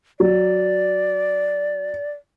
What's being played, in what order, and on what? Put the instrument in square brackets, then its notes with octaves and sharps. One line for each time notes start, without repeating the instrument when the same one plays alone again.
[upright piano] F#3 [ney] D5